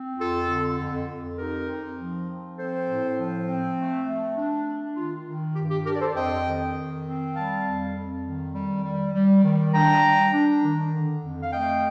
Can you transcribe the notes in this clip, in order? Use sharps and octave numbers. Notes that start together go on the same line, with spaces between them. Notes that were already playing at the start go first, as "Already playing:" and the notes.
Already playing: C4
F2 F4 A4
D3
F2
F2
D#4 G4 A#4
C4
F3
F3
C4 A4 C5
A2
F3
C4
A3
A3
D4
D4
D#3 F4
D#3
G2 G4
G4
D4 G4 A#4
D5
A4 C5
F2 D#5 G5
D#3
D#3
C4
G3 F5 A5
F2
F2
D#3
G3
G3
G3
D#3
D4 G5 A#5
G3
D4
D#3
D3
F2
F5
A3 D#5 G5